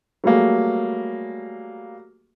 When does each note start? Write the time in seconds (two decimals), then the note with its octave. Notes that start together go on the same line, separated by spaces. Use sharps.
0.24 F#3 G3 A3 A#3 G#4